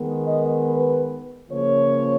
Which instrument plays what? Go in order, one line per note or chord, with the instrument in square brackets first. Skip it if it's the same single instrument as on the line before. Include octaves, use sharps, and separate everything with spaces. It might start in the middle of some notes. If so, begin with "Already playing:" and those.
Already playing: [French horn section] D#3 G#3 B3
D#5
B4
C#3 F3 A#3 C#5